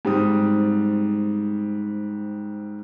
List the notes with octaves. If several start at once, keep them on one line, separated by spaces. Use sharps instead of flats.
G#2 G3 C4 D#6